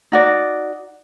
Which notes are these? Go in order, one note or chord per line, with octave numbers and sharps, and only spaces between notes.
D#4 F#4 D5